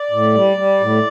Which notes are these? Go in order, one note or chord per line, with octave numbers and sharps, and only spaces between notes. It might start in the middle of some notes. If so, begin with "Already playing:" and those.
Already playing: D5
A2
G3
G3
A2